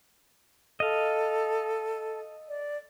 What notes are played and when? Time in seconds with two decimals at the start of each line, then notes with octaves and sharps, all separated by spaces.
0.80 A4 D#5 F5
2.49 D5